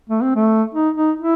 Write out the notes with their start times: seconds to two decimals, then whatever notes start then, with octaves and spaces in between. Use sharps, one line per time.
0.09 A3
0.22 C4
0.35 A3
0.74 D#4
0.96 D#4
1.18 E4